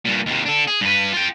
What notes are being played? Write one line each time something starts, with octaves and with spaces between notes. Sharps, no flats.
G2 A#2
D#2 C3
D4 A4
G#4
G2 B4
F4 G5